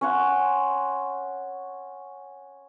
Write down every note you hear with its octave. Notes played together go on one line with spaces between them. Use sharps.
C#4 C#5 F#5 C6